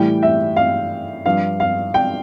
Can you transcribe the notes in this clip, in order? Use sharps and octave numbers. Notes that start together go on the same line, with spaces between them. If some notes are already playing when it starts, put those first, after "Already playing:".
Already playing: A2 E3 G3 G5
E5
F5
G2 F3 F5
F5
G5